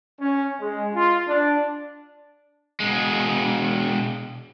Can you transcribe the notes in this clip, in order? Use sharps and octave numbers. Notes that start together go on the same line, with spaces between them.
C#4
G#3
F4
D4
B2 G#3